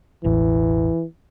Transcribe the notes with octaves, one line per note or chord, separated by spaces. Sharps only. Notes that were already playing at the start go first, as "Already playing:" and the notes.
E1 A1 E3